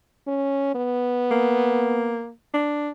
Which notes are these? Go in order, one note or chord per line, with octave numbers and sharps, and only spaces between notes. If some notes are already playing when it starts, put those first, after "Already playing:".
C#4
B3
A#3
D4